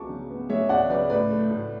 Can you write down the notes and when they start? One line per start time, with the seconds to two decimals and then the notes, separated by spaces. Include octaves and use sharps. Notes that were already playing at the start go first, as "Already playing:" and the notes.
Already playing: C#2 G#3 B3 A5 C#6 D6
0.09 C#3
0.29 B3
0.49 G#3 C#5 E5
0.69 C#2 D5 F#5
0.90 C#3 B4 D5
1.10 A2 B4 D5
1.30 A3
1.50 A2